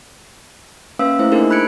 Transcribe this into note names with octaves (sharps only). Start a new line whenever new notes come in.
A#3 C#4 B4 F5 D#6 E6
A3 E4 C5
A#3 D4 D#4 G#4 A#4 C5
B5 F#6 G#6 C#7 D7